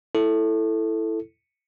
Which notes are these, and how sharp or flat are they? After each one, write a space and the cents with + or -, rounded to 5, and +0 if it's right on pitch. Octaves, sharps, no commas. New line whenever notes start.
E4 +0 A4 +0